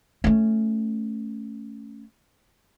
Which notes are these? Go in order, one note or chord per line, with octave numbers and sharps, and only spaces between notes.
A3 C#4